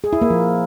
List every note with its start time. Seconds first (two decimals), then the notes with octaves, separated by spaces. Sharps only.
0.04 G#4
0.13 E4
0.21 A#3
0.30 F3